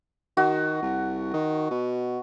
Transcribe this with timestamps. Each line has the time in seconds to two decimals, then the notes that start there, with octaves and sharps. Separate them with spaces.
0.37 D#3 F#4
0.82 C2
1.33 D#3
1.71 B2